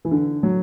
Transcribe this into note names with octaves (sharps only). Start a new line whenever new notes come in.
E3
D3
F#3